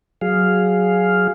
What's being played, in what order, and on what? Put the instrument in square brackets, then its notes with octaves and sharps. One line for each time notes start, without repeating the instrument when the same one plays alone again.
[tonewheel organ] F#3 G#4 F5